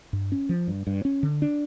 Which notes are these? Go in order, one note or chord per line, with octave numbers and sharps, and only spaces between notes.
G2
C#4
F3
G2
G2
C#4
D3
D4